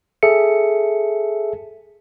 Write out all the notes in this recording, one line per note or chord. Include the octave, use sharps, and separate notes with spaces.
G#4 A4 E5 C#7